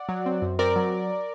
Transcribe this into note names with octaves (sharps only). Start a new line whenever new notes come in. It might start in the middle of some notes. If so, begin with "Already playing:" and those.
Already playing: D5 F#5
F#3
C4
F#2
C4 A#4 D5
F#3